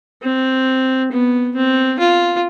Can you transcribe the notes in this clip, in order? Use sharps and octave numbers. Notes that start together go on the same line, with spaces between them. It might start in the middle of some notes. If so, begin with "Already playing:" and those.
C4
B3
C4
F4